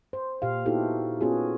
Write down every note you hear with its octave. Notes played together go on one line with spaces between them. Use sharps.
C5
A#2 G4 F5
B3 D#4 E4 F#4 G4 A4
B3 C#4 F4 F#4 G#4